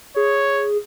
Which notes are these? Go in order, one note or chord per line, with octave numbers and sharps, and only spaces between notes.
G#4 C#5